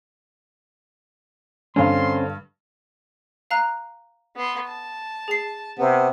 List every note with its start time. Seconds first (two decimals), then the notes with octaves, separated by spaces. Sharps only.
1.76 G2 D3 C4 C#4 F5 C6
3.51 F5 A#5 F#6
4.36 B3 C6
4.67 A5
5.28 G#4 C7
5.78 C3 B3